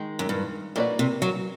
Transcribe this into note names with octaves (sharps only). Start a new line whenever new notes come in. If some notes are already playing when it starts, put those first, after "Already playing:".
Already playing: D#3 G#3
F#2
G2
A#2 A#3 D4 F#4 B4 D5
C3
F#3